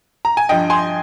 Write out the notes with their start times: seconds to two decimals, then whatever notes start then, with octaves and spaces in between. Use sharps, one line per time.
0.25 A#5
0.37 G#5
0.49 G2 F3 D#5 G5
0.70 G#5 C6